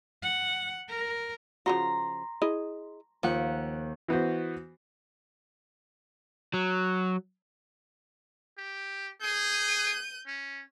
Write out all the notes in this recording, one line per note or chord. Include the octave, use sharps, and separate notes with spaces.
F#5
A#4
C#3 F3 F#4 A#5 C6
E4 G#4 D#5
D#2 F3 F#5
E3 B3 F#4 C5
F#3
G4
G#4 G6 D#7
C#4